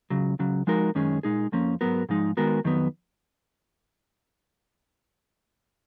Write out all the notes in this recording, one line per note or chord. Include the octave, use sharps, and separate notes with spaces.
C#2 C#3 F#3
C#2 C#3 F#3
F3 G#3 D#4 F#4 A#4
F#2 D#3 G#3 C#4 G#4
A#2 G#3 D#4 G#4
F2 F3 A#3 C#4
G#2 F#3 B3 F#4 A#4
G#2 F3 G#3 D#4
D#3 G#3 B3 F#4 A#4
F2 D#3 F#3 B3